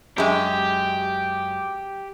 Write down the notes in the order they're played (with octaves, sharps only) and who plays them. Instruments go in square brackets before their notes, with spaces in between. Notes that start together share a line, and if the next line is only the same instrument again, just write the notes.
[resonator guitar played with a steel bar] F#2 G#3 [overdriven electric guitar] G4